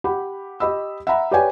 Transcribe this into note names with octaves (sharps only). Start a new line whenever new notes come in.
G4 F#5 B5
G4 D#5 B5 E6
E5 F#5 A#5 B5
G4 B4 C#5 D5 G5 G#5